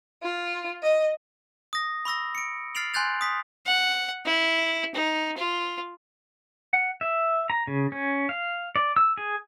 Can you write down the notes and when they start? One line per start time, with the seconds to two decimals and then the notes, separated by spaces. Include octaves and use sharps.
0.22 F4
0.83 D#5
1.73 D#6 A#6
2.05 B5 C#6 E6 A#6
2.35 C#7 D7
2.75 F6 A6 C7 D7 F7 F#7
2.94 G#5 C6 F#6 G6 A6 F7
3.21 D#6 B6
3.66 F#5
4.26 E4
4.95 D#4
5.37 F4
6.73 F#5
7.01 E5
7.50 A#5
7.67 C#3
7.92 C#4
8.29 F5
8.76 D5
8.96 E6
9.17 G#4